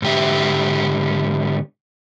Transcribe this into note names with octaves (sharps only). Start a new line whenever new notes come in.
G#2 D3 G4 E5